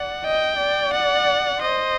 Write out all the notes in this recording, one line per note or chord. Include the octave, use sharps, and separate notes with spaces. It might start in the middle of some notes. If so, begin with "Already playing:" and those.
Already playing: D5 F#5
D#5 G5
D5
F#5
C5 D#5